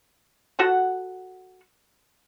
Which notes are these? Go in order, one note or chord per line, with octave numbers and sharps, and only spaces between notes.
F#4 A4 F#5